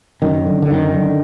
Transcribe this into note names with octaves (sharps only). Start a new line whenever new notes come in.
F#2 D#3
D3
D3
F#2 D#3
D3